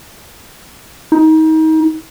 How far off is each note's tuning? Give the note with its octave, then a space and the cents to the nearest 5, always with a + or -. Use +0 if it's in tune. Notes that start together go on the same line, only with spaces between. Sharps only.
D#4 +30